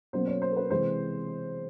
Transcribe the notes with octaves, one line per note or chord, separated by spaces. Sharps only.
B2 F#3 A#3 C#4 C5
C#5
C5
A#4
B4
C3 E3 G#3 C4 C5